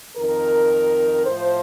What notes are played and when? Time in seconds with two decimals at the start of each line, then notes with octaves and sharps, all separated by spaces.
0.17 F2 D#3 A#4
1.26 A2 F3 C5